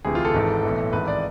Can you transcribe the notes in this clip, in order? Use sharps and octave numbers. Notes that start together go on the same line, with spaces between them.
D2 C3 E3 G#4
F4
A4
G#1 G#2 E3
B1 A2 E3
G#1 G#2 E3 B4
D5